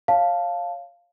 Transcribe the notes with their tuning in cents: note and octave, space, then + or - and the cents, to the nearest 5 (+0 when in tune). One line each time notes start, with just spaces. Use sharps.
C#5 +0 F5 +0 A5 +0